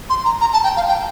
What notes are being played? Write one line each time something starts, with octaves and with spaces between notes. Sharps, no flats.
C6
A#5
A#5
A5
G5
F5
G5